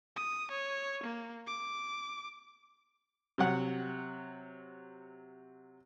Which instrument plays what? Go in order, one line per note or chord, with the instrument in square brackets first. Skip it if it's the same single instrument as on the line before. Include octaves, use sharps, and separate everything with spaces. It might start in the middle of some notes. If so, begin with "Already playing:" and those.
[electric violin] D#6
C#5
A#3
D6
[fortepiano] C3 F#3 F#5